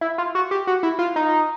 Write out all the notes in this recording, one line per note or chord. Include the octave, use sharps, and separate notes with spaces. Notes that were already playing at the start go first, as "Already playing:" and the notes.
E4
F4
F#4
G4
F#4
E4
F4
D#4